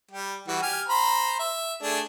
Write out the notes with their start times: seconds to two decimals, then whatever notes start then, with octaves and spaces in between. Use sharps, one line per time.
0.11 G3 G4
0.48 E3 G3 F#4
0.62 G4 G#5 F6
0.88 C5 A#5 B5
1.39 E5
1.83 A3 D4 G#4